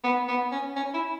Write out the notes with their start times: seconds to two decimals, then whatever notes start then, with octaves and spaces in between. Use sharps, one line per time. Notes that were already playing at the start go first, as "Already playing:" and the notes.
0.04 B3
0.28 B3
0.51 C#4
0.76 C#4
0.94 E4